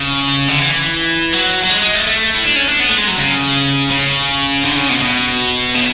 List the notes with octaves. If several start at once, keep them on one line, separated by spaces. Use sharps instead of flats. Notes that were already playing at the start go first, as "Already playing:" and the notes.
Already playing: C#3
D3
E3
F#3
F#3
G#3
G#3
A3
A3
E4
D4
C#4
D4
B3
A3
G#3
F#3
C#3
C#3
D3
C#3
B2
B2
C#3